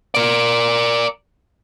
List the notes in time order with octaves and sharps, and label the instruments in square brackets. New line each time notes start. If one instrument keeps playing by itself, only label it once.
[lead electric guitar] A#4 D5